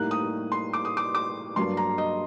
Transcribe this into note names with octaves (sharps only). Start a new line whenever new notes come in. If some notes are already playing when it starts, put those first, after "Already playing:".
Already playing: A2 G3 A#3 D#4 F#6
D#6
C6
D6
D#6
D6
D6
G2 F#3 A#3 D4 C6
A#5
D#5